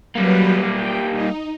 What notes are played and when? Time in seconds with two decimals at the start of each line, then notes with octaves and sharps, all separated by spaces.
0.16 F#3 G3 A#3 B4
0.74 G5
1.12 D#4